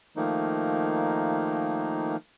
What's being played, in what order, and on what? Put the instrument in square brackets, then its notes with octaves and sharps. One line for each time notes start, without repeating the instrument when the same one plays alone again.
[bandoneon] D#3 F3 A3 A#3 D#4